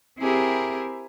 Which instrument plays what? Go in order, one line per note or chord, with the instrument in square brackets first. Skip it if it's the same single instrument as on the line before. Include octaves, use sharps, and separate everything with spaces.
[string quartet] C4 E4 G4 G#4 A#4